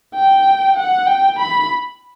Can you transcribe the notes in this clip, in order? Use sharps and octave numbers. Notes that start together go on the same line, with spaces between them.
G5
F#5
G5
B5